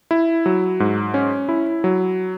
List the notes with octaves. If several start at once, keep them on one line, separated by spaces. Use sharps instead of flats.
E4
F#3
G#2
C#4
E4
F#3